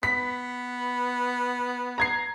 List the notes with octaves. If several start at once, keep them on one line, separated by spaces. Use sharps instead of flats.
B3 B6
A#5 G#6 C7